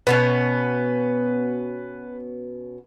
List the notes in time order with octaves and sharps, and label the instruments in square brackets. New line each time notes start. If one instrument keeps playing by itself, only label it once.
[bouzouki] B2 B3 C#4 [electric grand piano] B4